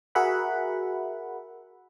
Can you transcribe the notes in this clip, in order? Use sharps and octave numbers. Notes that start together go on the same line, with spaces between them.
F#4 G#4 A#4 E5 F#5 B5